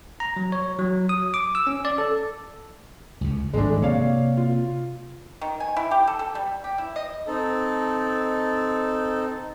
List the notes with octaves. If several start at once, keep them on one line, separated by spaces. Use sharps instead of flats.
A#5
F#3
C#5
F#3
D#6
D6
E6
C#4
D5
A4
C#2 C#3
G#1 G2 F3 G#3 A3 D4
C3 A#3 C4 C#5 D5 F5
F4
D#3
G#5
E4
G4
A4
A4
G3
G4
E4
D#5
C4 D#4 A4